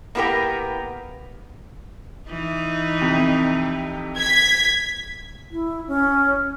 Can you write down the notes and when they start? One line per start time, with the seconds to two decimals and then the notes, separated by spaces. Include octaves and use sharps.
0.15 A#3 B3 E4 G4 A#4 G5
2.28 E3 D#4
3.01 F2 C3
4.18 G#6 B6
5.51 E4
5.88 C#4